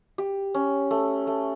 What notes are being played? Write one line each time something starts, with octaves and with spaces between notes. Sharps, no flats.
G4
C#4
A3
A3